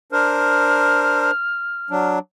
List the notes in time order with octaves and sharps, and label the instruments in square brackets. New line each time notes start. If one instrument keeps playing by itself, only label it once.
[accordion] D4 A#4 C5 [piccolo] F6
[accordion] F#3 D4